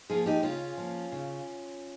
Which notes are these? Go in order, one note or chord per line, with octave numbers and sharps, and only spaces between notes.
F3 A#3 F4 G#4
D#4 G4
C#3 C#4 F4
F3 A#3
C#3